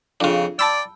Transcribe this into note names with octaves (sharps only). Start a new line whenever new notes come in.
F2 C#3 D4 F4
D5 G5 A5 B5 E6